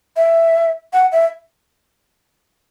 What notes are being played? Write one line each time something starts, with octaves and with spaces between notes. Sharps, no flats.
E5
F#5
E5